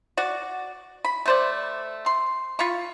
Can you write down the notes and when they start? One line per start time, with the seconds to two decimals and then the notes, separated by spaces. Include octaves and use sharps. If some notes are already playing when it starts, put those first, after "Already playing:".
0.17 F#4 D5
1.05 B5
1.26 A3 C5 D5
2.06 C6
2.59 F4 F5 B5 C#6